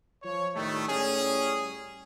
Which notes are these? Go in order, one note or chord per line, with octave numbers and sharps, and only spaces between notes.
F3 C#5
A2 D#3 G3 A3
A2 G3 C#4 G#4